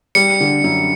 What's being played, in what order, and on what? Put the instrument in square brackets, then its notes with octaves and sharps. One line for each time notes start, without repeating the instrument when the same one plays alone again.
[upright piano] G3 [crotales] C#7
[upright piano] D3
F#2